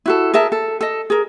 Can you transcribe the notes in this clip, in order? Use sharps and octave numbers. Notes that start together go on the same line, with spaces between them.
E4 F#4 A4
G#4 A#4 E5 A5
A4
A4 D#5
G#4 A#4